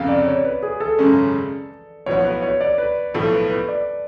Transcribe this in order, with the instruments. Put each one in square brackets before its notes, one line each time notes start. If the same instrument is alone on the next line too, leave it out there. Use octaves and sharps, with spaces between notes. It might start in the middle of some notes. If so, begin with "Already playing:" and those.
Already playing: [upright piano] F1 F2 C#3 [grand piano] F5
[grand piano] D5
C#5
B4
G#4
A4
[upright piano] G#1 F#2 C#3 G#3 C#4
[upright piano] B1 A2 F3 B3 F#4 [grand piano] C#5
[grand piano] B4
C#5
D5
B4
[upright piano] B1 A2 F3 [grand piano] A4
[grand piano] B4
B4
D5